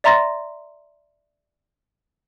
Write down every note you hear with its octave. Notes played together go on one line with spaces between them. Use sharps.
D5 E5 A#5 C6 A6 A#6